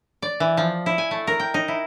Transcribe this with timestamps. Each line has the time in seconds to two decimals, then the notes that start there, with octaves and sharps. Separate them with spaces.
0.22 D5
0.40 E3
0.57 F3
0.86 E4
0.98 G#5
1.11 A3
1.27 A#4
1.40 G5
1.54 D#4
1.68 E4